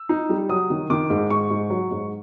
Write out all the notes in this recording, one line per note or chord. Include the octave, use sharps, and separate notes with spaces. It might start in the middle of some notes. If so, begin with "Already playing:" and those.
Already playing: E6
D#4
G3
F#3 D#6
D#3
D#3 D6
G#2
G#2 C#6
G#2
F#3
G#2